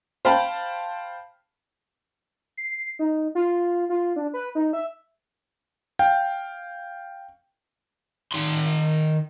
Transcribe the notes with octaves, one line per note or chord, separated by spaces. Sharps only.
C5 F5 G5 A5 B5
C7
D#4
F4
F4
D4
B4
D#4
E5
F5 G5
D#3 C6